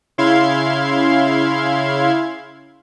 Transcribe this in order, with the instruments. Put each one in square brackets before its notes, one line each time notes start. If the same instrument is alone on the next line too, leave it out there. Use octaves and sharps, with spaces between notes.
[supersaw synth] C#3 E4 F5 C6 G#6